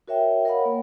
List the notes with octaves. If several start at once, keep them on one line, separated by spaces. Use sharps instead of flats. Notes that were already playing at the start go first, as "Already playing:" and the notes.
F#4 A#4 C#5 E5 G5
A#4 C#5 D#5 F5 F#5 B5
A#3